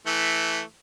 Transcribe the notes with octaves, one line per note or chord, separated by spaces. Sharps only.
E3 A3